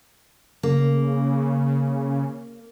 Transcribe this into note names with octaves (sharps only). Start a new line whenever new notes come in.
C#3 A#3